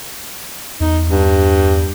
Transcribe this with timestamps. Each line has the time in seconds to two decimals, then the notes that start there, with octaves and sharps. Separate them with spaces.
0.80 E2 D#4
1.08 G2